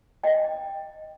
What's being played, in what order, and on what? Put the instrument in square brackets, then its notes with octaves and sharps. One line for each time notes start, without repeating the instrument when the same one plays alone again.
[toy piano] D#5 G5